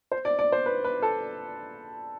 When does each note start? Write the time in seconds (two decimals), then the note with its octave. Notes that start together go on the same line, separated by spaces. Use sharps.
0.12 C5
0.25 D5
0.39 D5
0.52 C5
0.66 B4
0.84 B4
1.02 A4